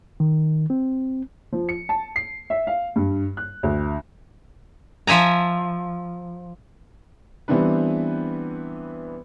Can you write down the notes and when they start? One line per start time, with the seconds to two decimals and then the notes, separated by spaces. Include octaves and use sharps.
0.20 D#3
0.70 C4
1.52 F3
1.69 C#7
1.89 A5
2.16 C7
2.50 E5
2.67 F5
2.96 G2
3.37 F#6
3.63 D2
5.07 F3 E5 G#5 A#5
7.48 E3 G3 B3 C4 D4 B4